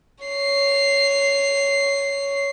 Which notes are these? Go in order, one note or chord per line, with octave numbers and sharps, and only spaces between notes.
C#5 C7